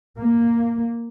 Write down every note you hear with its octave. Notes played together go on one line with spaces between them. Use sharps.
A#3